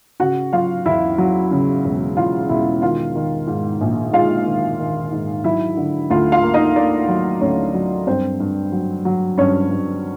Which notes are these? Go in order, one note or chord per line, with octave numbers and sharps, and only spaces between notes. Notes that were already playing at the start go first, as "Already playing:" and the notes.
C#3 F#4 F#5
F#3 F4 F5
E2 E4 E5
F#3
C#3
E1
E2 F4 F5
E1 E4 E5
D#3 F4 F5
D#3
G#2
A#1
G#3 F4 F5
D#3
D#3
G#2
F#3 E4 E5
D3
D2 F4 F5
F4 F5
A#3
D#4 D#5
A#3 D4 D5
F#3
D2 C#4 C#5
F#3
G2 C4 C5
G2
F#3
F#3
G2 C#4 C#5
G2